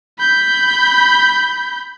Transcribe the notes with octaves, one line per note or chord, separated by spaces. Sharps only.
B5 G6